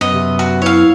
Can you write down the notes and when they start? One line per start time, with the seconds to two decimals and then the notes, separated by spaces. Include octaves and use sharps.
0.01 F#2 B3 D#5
0.12 C3
0.39 F#4
0.62 E4 C#5 F5